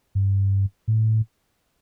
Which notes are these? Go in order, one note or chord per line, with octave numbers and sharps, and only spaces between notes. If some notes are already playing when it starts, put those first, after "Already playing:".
G2
A2